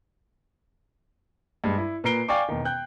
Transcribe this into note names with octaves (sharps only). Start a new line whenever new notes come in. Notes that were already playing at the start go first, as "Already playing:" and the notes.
G2 G#3
E4
A#2 B4 A#5 C7 D7 G7
D5 F5 G5 G#5 C#6 D6
E1 D#3
G5 F#6 G6